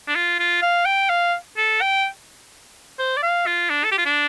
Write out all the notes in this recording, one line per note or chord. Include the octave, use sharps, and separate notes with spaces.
D4
F4
F4
F5
G5
F5
A4
G5
C5
D5
F5
F4
D4
A4
G4
F4
D4